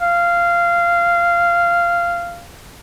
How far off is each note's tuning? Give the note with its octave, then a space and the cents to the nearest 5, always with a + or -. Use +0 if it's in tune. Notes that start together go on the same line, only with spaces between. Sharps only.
F5 -15